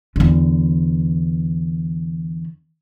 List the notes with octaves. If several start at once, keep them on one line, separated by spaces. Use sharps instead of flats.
E2 D3